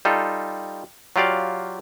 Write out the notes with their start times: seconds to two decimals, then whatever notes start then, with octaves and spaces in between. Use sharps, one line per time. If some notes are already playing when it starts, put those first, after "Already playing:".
0.05 G3 D#4 F4 A4
1.16 F#3 F4 G4 D5 F5